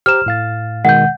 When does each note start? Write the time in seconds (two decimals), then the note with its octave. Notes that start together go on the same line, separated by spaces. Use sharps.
0.06 G4 C5 A#5 F6 E7
0.26 A2 F5 A6
0.85 B2 D#3 G#3 F#5 G6